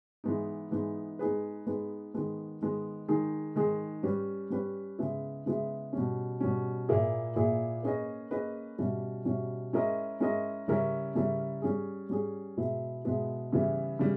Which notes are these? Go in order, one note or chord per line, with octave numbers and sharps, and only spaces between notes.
E3 G#3 B3 D#4
E3 G#3 B3 D#4
G#3 B3 D#4 G#4 B4
G#3 B3 D#4 G#4 B4
D#3 G#3 B3
D#3 G#3 B3
D#3 G#3 D#4 G#4
D#3 G#3 D#4 G#4
G3 C#4 G4 B4
G3 C#4 G4 B4
C#3 G#3 B3 E4
C#3 G#3 B3 E4
B2 G3 C#4
B2 G3 C#4
A#2 A#3 E4 G#4
A#2 A#3 E4 G#4
A#3 C#4 G#4 B4 D#5
A#3 C#4 G#4 B4 D#5
B2 G3 C#4 E4
B2 G3 C#4 E4
G#3 C#4 E4 A#4 D#5
G#3 C#4 E4 A#4 D#5
C#3 G3 C#4 E4 A#4
C#3 G3 C#4 E4 A#4
G3 C#4 G#4
G3 C#4 G#4
B2 G#3 B3 E4
B2 G#3 B3 E4
C#3 E3 G3 B3 E4
C#3 E3 G3